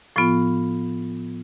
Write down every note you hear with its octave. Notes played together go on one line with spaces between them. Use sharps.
A2 F3 B3 F4